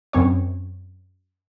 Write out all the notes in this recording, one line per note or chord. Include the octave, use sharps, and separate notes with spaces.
F#2 C4 C#5